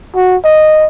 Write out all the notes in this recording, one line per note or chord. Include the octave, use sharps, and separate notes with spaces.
F#4
D#5